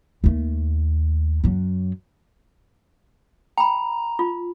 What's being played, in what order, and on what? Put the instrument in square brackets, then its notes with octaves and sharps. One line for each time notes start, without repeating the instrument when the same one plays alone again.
[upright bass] D#2 A3
F#2 F#3
[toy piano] G5 B5 [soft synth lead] A#5
[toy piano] F4